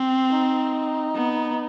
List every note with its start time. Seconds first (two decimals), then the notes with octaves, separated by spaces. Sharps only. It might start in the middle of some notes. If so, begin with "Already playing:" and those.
Already playing: C4
0.30 D#4
1.15 B3